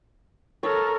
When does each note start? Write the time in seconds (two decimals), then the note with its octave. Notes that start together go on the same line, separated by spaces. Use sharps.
0.63 A4 A#4 C#5